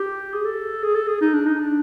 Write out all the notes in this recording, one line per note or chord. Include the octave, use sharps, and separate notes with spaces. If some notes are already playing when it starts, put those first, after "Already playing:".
Already playing: G4
G#4
A4
G#4
A4
G#4
D#4
D4
D#4
D4